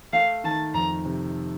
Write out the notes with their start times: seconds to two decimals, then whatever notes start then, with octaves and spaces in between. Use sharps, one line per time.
0.13 A3 F5
0.44 D#3 A5
0.74 F2 A#5
1.06 C3